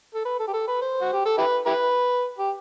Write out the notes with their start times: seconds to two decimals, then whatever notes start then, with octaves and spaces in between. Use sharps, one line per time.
0.14 A4
0.25 B4
0.39 A4
0.47 G4
0.53 A4
0.67 B4
0.82 C5
1.01 F#4
1.13 G4
1.25 A4
1.38 E4 G4 B4
1.66 E4 G4 B4
2.38 G4